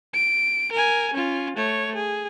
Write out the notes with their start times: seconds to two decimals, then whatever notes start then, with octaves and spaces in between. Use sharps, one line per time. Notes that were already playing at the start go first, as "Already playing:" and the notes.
0.14 D7
0.72 A#4 G#5
1.13 C#4 F4
1.56 A3 C#5
1.95 G#4